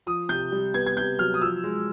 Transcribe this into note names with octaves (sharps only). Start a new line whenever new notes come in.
F3 D#6
C3 G6
G3
B3 G#6
G#6
C3 G6
F#3 F6
D#6
F3 E6
G#3